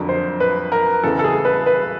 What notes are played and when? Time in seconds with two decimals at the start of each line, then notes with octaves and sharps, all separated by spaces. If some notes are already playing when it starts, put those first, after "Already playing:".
Already playing: F2 D3 F#3 A#4
0.09 C5
0.40 B4
0.72 A#4
1.03 E2 C#3 E3 A4
1.19 A4
1.24 G#4
1.45 B4
1.66 B4